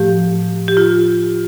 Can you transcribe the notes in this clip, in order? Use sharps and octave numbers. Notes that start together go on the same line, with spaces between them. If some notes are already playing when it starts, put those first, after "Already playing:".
Already playing: A2 F3 A3 G4
G4
F4